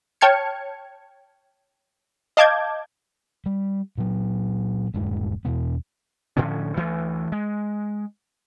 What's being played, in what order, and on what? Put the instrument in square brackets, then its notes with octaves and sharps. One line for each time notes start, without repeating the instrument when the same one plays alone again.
[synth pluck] C#5 G5 A5 F6 G#6 C#7
D#5 F5 A5 D6 G6 G#6
[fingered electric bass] G3
A#2 F#3
D#1 G2 G#3
E2 B2 B3
[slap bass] A2 D3 F3 C#4
D2 E3 A3
G#3